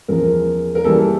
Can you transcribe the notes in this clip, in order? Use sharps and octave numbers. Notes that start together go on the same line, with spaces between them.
E2 C#3 F3 A#4
A#4
C#2 C#3 E3 G3 A#3 A4